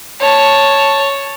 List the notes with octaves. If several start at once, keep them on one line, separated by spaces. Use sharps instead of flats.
C#5 A5